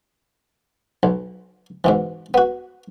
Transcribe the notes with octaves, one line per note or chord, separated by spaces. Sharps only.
B1
G#2 B2 E3
B3 F#4